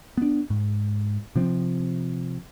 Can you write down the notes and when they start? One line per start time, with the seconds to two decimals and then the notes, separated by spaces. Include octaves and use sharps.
0.17 B3 D4
0.50 G#2
1.36 C3 F3 C4